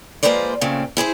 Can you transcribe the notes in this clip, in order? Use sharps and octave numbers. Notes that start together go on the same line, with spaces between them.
F3 G#3 A#3 B4 C5 D5
A#2 C#3 A3 C4
E4 G#4 A#4 C5